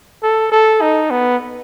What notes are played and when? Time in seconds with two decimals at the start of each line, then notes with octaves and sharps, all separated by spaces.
0.23 A4
0.52 A4
0.81 D#4
1.11 B3